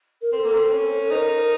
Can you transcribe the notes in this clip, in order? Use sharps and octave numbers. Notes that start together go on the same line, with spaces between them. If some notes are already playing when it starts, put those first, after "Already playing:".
A#4
C4 A4 A#4
A#3
C4
C#4
D#4 A#4 C5